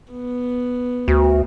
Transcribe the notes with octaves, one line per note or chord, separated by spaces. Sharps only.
B3
D2 F#4